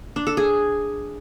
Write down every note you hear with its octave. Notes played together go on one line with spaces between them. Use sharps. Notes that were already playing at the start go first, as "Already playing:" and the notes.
D4
A4
G#4